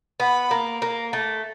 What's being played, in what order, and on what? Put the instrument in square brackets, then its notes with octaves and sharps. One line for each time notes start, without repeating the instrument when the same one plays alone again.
[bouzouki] B3 [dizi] B5
[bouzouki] A#3
A#3
A3